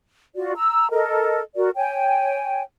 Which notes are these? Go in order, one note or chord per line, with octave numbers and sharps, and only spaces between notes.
F4 F#4 D5
A#5 E6
A4 A#4 D#5
F#4 A#4 D5
C#5 G5 G#5